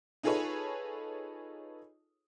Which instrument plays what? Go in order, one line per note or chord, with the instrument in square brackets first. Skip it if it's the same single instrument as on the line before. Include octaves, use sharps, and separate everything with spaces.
[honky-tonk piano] D#4 F4 G#4 A4 B4 C#5